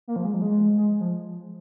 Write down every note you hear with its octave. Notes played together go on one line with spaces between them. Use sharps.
A#3
F3
G#3
F3
G#3
G#3
F3